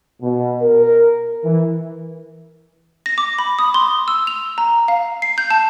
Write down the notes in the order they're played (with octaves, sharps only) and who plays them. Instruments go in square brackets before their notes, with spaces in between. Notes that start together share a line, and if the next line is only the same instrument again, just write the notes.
[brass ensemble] B2
A#4
E3
[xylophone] A#6
D6
B5
D#6
C6
E6
F7
A#5
F5
C7
G6
A5